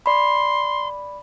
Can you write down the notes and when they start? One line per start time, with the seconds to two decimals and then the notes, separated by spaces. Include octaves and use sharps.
0.06 D5 B5 C6